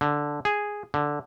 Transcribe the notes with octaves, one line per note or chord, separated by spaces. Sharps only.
D3
G#4
D3